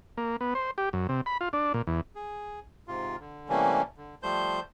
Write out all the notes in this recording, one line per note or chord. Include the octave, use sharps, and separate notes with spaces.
A#3
B3
C5
G4
F#2
C3
B5
F4
D4
A#2
E2
G#4
G#2 C3 F4
D3
C3 E3 G3 A3 A#3 C#4
D3
F3 G3 A3 C5 G6